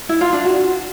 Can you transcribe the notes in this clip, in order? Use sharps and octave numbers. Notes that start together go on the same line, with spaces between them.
E4
F4
D4
F#4